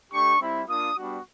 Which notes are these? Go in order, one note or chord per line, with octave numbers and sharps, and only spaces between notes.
A3 D4 G4 C#6
G3 C4 E4
A#3 D4 F4 D#6
G3 B3 D4 F#4